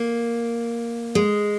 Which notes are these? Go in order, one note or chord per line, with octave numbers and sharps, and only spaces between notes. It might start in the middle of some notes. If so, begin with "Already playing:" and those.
Already playing: A#3
G#3